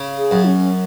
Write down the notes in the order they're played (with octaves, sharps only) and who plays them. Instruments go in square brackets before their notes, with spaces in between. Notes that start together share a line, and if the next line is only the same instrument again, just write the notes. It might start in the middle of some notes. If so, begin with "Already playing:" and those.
Already playing: [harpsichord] C#3
[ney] G#4
[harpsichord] F#2
[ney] C#4